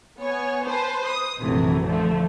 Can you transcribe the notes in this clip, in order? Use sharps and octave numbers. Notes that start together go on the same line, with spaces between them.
B3 C#5 G#5
B4 C5 A5
D#6
A#1 F#2 C3 E3 F#3 A3
D3 E3 F3 A3